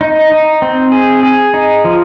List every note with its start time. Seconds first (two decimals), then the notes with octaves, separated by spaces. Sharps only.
0.01 D#4
0.32 D#4
0.62 C4
0.92 G#4
1.23 G#4
1.54 D#4
1.85 F3